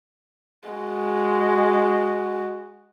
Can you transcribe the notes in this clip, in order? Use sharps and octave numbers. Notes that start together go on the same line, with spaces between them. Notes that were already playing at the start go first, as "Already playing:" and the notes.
G#3 F#4